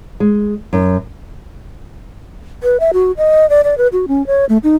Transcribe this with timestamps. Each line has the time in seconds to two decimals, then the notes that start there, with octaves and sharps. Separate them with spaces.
0.20 G#3
0.73 F#2
2.63 B4
2.80 E5
2.93 F#4
3.17 D#5
3.50 D5
3.64 D5
3.78 B4
3.92 F#4
4.08 C#4
4.27 C#5
4.49 A3
4.63 D#4